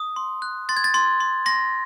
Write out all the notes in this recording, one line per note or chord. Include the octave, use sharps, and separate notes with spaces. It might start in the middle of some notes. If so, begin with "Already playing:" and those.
Already playing: D#6
C6
F#6
C6 A6
G#6
A6
C6
C6
C6 A#6